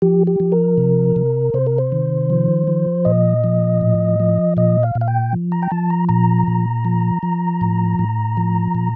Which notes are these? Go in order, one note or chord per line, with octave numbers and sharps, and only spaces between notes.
F3 G4
G4
F3
A#4
C3
C3
C3 C5
A#4
C5
D#3
F3
F3
A#2 D#5
F3
A2
F3
A#2 D#5
F5
A#2
F5
G5
F3
A#5
G5
F3 A5
A#5
A#2 A#5
A#2
F3
F3
A2
A2
F3
A#2